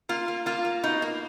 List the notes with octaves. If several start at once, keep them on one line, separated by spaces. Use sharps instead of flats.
A#3 F4
A#3
A#3 F4
A#3
B2 D#4
A#3